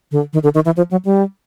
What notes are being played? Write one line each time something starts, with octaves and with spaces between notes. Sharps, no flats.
D3
D#3
D3
D#3
E3
F3
F#3
G3